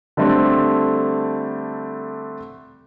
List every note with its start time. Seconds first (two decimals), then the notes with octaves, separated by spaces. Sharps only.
0.17 D3 G3 A3 C4